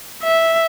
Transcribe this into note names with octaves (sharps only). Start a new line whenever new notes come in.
E5